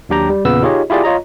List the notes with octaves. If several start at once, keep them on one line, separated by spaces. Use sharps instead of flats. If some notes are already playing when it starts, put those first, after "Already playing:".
D#2 F#3 D4 G4 G5 A#5
G3
E2 A#2 C#3 B3 B4 E6
D#4 F4 G4 G#4 C#5 D#5
E4 F4 G4 G#4 D5
F4 C#5 D#5 A#5